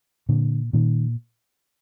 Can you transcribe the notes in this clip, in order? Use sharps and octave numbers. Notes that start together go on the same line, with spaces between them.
A#2 D3
A#2 D#3